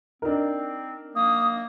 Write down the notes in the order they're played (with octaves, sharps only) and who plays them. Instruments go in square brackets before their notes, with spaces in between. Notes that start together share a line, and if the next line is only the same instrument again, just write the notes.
[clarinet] C4 [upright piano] D4 D#4 A#4
[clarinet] A#3 [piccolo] D#6